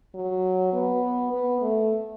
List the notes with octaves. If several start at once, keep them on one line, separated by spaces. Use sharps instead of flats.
F#3
B3
B3
A3